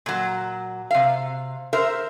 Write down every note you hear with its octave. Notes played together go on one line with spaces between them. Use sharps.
A#2 F#3
C3 F5
A#4 C5 E5